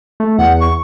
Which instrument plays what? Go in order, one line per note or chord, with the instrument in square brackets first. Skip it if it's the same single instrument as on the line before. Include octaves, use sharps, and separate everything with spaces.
[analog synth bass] A3
[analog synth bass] E2 [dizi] F#5
[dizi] C#6